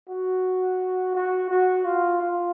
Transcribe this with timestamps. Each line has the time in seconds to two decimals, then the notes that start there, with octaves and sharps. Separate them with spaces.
0.09 F#4
1.15 F#4
1.50 F#4
1.85 F4
2.21 F4